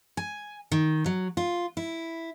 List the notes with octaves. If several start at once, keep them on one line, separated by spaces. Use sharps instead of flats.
G#5
D#3
F#3
F4
E4